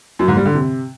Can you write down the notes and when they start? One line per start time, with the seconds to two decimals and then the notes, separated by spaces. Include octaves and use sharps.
0.19 F#2
0.28 G#2
0.37 G3
0.45 D3
0.54 C3